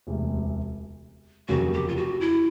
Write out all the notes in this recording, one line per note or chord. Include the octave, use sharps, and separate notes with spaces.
E1 D2 C3
F1 D#2 C#3 F#3 A#3 F#4
G4
F4
F#4
E4